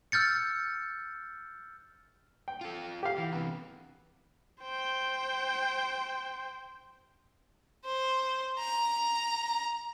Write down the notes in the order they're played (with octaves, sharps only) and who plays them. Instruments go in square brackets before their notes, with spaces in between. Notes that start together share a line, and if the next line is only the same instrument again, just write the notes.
[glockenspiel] E6 F6 G6 A6 C#7
[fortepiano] G5
[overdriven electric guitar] F4 A4
[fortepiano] G4 F5
[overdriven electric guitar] E3
[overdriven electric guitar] C3 E3 [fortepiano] B3
[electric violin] C5 G5
[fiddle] C5
A#5